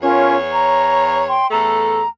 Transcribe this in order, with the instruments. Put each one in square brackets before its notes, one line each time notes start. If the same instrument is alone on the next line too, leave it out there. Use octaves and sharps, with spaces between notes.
[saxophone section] E2 C#5 [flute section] C#4 F4 A#4
[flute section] A#5
G5 C6
[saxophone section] E2 A3 A4 [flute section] A#5